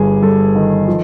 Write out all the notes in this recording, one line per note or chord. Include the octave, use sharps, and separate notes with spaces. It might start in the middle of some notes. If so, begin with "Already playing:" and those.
Already playing: G1 G2 G#4
G3 A4
D#3
F3